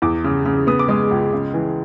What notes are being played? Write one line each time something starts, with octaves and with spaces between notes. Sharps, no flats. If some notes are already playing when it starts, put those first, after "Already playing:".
E2 D6
C#3
C#3
B3 D#6
D6
G#3 D#6
C#2
C#3
E3